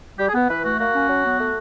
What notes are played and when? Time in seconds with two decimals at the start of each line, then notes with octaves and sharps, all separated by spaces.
0.19 G3 G4
0.29 G#4
0.34 B3
0.49 E3 B4
0.64 A3 F#4
0.79 A#3 F#4
0.94 C#4
1.09 F#3
1.24 B3
1.39 A3